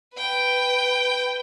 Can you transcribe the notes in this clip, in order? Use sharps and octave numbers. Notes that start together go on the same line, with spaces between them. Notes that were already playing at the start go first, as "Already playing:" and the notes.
B4 G5